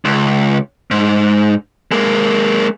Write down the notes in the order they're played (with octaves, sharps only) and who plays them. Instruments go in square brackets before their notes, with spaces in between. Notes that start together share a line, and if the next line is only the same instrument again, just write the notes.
[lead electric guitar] C#2
G#2
G#3 A#3